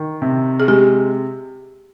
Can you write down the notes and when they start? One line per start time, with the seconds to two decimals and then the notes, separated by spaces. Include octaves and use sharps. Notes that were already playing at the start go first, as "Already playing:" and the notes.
Already playing: D#3
0.22 C3
0.60 G#4
0.68 G#3 G4